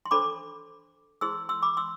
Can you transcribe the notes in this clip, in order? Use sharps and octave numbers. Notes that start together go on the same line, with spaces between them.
C6
D4 A4 C5 B5 D6
E4 G#4 C5 C6 E6
C6 E6
B5 D6
C6 E6